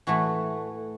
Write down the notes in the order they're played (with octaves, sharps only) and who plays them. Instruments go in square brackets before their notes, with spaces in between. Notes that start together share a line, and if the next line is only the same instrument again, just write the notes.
[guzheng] A2 E3 A3 F#4